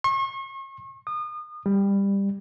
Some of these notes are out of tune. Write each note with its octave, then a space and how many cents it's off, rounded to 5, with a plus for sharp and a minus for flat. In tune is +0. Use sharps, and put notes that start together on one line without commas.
C#6 -40
D#6 -35
G3 +15